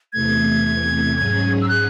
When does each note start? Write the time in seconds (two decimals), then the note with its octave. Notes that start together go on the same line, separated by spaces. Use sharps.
0.13 E2 C3 E3 A3 G#6
1.16 G#2 F#3 C#4 G#4
1.62 E6
1.69 F#6